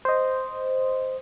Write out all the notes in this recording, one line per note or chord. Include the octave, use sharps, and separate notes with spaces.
C5 D#5